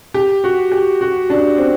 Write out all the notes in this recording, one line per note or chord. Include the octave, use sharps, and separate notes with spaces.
G4
F#4
G4
F#4
D4
C4